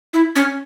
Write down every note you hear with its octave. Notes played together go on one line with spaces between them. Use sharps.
E4
C#4